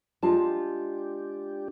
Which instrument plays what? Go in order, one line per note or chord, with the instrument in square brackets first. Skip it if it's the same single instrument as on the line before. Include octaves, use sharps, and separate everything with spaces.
[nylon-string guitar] G#3 F4 A5 [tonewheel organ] D4 G4